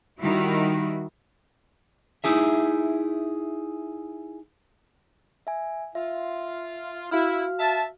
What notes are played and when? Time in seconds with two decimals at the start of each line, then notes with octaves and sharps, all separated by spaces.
0.19 D#3 G3 E4 F#4
2.24 D#4 E4 G#4 E5
5.47 E5 G#5
5.95 F4 E5
7.11 E4 F#4 F5 F6
7.59 E5 A5